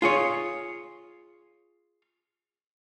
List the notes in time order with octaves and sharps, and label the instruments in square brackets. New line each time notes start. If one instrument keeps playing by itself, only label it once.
[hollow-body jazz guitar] F4 G#4 C#5